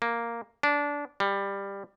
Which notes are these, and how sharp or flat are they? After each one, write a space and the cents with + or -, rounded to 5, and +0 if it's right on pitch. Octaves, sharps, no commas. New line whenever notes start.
A#3 +0
D4 -20
G3 +15